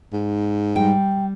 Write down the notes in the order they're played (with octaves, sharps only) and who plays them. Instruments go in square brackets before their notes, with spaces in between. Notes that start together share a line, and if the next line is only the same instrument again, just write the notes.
[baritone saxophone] G#2
[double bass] G3 [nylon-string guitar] G5